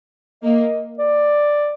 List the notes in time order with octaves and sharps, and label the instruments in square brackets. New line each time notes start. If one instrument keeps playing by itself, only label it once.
[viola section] A#3 [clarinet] D#5
[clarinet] D5